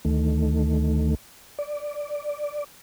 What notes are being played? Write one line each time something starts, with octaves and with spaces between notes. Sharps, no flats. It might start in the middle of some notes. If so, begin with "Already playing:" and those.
D2 D#3 A3
D5